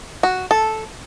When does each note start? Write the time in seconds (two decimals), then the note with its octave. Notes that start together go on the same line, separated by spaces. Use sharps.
0.23 F#4
0.51 A4